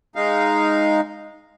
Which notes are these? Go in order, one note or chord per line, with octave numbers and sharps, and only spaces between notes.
G#3 D#4 F5